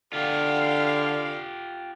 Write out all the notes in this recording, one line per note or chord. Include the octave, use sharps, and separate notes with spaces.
D3 F4 G4 F5